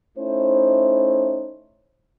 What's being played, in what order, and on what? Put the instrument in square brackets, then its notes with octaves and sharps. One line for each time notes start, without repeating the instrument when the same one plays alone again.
[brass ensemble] A3 C#4 D#4 E4 C5